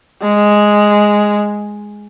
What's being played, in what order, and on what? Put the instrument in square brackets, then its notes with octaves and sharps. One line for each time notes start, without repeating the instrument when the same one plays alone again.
[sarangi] G#3